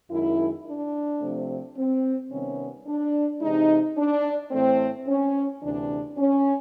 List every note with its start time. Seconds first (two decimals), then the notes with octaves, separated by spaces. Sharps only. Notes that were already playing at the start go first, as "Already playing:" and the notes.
0.10 F#2 D#3 G#3 E4
0.65 D4
1.20 C3 F3 A3 C4
1.76 C4
2.30 C3 D#3 G3 B3 C#4
2.87 D4
3.41 C3 E3 G#3 D#4
3.97 D4
4.51 A2 E3 A3 C4
5.07 C#4
5.61 D2 C3 E3 D4
6.17 C#4